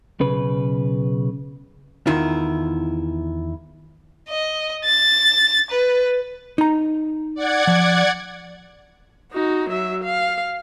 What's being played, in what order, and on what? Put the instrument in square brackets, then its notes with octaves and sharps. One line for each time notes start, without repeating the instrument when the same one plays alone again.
[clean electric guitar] B1 C#3 B4
[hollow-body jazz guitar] E2 D#3 E4 F4
[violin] D#5
A6
B4
[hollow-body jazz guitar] D#4 A#5
[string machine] D5 F#5 G#6
[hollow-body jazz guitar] F3
[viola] D#4 F#4
F#3 E5
F5